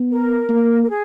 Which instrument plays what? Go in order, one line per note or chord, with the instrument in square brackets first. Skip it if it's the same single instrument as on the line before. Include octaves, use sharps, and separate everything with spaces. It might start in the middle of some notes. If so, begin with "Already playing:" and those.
Already playing: [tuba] B3
[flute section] A#4
[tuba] A#3
[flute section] A#4
G#4